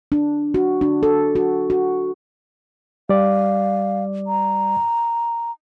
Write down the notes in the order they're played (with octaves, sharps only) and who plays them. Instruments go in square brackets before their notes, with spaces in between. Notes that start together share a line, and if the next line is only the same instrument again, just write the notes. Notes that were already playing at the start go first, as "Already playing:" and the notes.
[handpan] D4
F#4
D4
A4
F#4
F#4
[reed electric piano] G3 D5 [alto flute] F5
[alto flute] A#5